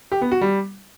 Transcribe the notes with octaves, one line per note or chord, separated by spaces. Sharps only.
G4
B3
F#4
G3